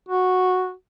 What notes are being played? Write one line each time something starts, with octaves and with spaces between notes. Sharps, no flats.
F#4